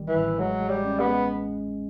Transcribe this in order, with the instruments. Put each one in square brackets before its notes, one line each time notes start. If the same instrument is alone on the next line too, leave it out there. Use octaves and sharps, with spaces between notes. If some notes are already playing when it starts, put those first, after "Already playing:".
Already playing: [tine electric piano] A1 D#3 G3
[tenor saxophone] E3
[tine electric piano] A1
[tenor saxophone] F#3 [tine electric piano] G#3
[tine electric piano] G#3
[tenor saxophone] G3
[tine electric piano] C#4
[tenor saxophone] B3
[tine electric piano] G#3